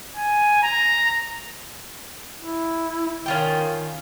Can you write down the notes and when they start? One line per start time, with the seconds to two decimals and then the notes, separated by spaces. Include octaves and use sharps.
0.16 G#5
0.63 A#5
2.40 E4
3.26 D#3 C#4 F4 G5